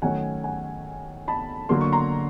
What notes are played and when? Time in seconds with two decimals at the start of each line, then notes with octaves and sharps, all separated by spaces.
0.02 D#3 F#3 A3 C#4 F#5 G#5
0.44 F#5 G#5
1.28 A5 B5
1.69 D3 F#3 A#3 C6
1.81 C#6
1.92 A#5 C6